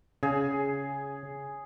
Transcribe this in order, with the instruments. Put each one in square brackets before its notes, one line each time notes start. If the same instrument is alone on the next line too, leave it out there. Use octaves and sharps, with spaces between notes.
[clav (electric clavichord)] C#3 [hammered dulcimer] G#4